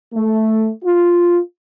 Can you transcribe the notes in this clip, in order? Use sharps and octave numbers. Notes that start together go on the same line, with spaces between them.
A3
F4